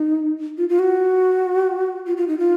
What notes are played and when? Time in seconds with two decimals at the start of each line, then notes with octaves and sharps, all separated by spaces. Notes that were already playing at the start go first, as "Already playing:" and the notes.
Already playing: D#4
0.58 F4
0.69 F4
0.79 F#4
2.06 F4
2.17 F4
2.28 D#4
2.39 F4